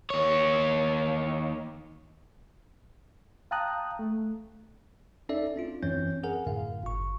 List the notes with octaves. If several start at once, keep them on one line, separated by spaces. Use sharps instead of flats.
D#2 C#5
F5 G5 A5 A#5 D#6 F#6
A3
C#4 D#4 A4 D5 E5
C4 D4 F4
F#2 E3 C4 C#4 C#5 G6
G#4 A#4 F#5 G#5
F#2 A2 D3 F5
G1 C#6